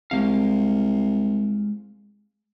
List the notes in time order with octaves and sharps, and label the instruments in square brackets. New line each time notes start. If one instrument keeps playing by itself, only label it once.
[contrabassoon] C2 [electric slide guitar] G#3 F5